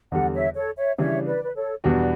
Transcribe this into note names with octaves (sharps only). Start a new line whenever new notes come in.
E2 D3 G3 D5 F#5
C#5 E5
A4 C#5
C#5 E5
C#3 E3 G3 D4 C#5 E5
B4 D5
B4
A4 C#5
E2 B2 G3 D4 F#4 B4 D5